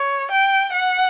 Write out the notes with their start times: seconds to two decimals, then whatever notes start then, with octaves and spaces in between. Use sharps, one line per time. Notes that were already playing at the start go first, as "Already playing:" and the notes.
Already playing: C#5
0.31 G5
0.73 F#5